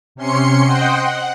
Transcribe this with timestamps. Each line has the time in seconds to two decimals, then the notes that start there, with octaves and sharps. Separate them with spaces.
0.15 C3 C#4 C6 C#7
0.64 C5 D#5 F#5 G5 C6
1.02 F#5